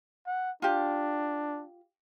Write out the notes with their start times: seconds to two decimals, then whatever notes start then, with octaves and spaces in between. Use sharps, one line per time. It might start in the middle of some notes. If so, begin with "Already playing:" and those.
0.26 F#5
0.62 D4 F4 G4